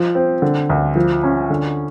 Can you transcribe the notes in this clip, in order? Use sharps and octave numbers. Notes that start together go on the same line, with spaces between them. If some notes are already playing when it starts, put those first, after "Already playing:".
Already playing: F3
C4
D3
D2
F3
C#4
D3